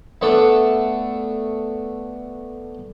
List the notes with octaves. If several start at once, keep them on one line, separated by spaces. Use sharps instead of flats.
A3 B3 D4 F#5 A5